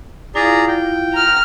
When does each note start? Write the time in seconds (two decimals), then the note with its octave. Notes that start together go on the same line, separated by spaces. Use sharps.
0.35 E4 F4 G#4 D5 F5 A#5
0.68 G5
1.13 A#5 F6